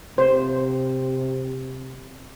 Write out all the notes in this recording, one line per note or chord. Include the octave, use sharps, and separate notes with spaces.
C3 C5